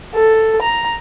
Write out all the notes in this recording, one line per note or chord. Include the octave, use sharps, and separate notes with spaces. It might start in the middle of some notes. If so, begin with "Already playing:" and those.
A4
A#5